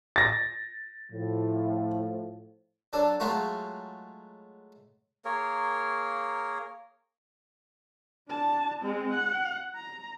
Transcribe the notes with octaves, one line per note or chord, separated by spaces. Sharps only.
A6 A#6
A2 F3
F#3 D4 A4
F#3 G#3 A3 F4 F#4
A#3 G#4 A#4 C#5
D4 A5
G#3 C4
F#5
A#5